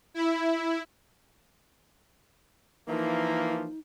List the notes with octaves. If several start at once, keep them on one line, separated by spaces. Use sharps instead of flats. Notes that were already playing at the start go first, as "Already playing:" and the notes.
E4
E3 F3 A#3 D#4